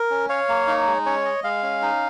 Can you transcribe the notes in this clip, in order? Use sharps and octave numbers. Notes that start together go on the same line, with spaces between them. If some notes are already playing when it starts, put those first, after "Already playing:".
Already playing: A#4
C#4
C#5 F5
A#3
D#4
G#3
C#4 C#5
D#5
G#3 F5
C#4
D#4